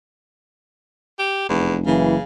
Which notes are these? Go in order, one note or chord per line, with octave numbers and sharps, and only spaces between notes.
G4
F1 E2
F#1 C#3 E3